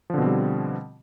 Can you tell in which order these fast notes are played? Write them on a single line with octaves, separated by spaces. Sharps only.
F3 D3 B2 C4 G3